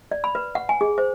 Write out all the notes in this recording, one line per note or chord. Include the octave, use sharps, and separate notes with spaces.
D5
B5
B4
F#5
G#5
G#4
C5